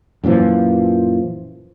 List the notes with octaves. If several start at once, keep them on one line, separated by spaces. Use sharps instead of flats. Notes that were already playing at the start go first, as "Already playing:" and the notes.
F#2 A#2 E3 F3